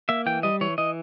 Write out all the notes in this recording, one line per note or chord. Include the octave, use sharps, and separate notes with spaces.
A#3 E5
E3 G5
G3 D#5
E3 C#5
E3 D#5